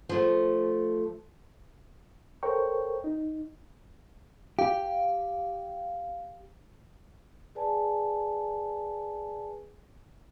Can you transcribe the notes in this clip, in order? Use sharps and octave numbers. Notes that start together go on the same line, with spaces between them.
F3 A3
A4 A#4 C5 C#5 G5 C#6
D#4
G4 F5
G#4 B4 D5 G#5 A5